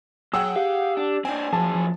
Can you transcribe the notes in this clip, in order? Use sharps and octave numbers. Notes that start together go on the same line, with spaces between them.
F#3 G#4 F#5 G5 E6
G4 F5
D4
C4 D4 G5 G#5
F#2 F3 G#4 A5
F3